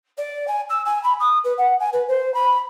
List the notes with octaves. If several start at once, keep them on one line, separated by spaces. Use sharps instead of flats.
D5
G#5
E6
G#5
B5
D#6
B4
F#5
G#5
B4
C5
B5